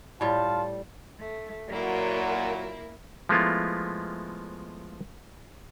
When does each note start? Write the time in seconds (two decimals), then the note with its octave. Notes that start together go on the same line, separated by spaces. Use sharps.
0.21 A2 G3 F4 A5
1.20 A3
1.70 A#2 F#3 A#3 E4 A#4
3.29 F3 G#3 A3 B3 E4 F4